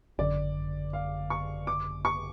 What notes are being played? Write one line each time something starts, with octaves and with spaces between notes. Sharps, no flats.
G#1 F#2 D3 D5
F5
C#6
D6
C#6